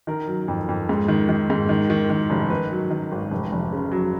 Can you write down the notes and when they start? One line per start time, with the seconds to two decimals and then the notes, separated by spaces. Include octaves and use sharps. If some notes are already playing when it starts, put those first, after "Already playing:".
0.07 D#3 A#4
0.28 F#3
0.48 F2
0.69 F2
0.89 G#2
1.08 D#3
1.29 D#3
1.50 G#2
1.69 D#3
1.90 D#3
2.10 D#3
2.30 F1
2.50 D#3 B4
2.71 F#3
2.90 D#3
3.12 G#1
3.31 F1
3.52 F1
3.73 C#3
3.92 F#3